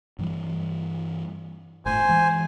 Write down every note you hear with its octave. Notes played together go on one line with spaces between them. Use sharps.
G2 E3 G3
G1 A2 C5 G#5
E3 G#3